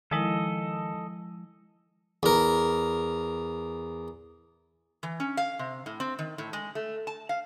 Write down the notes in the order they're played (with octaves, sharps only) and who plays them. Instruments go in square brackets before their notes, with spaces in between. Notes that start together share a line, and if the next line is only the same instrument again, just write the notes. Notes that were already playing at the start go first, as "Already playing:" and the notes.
[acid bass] D#3 [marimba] F3 G#3 E4 [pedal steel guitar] A4 D#5
[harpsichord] E2 A#4
[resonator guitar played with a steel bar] E3
C#4
F5
C3
A2
C4
D#3
A2
G#3
A3
A5
F5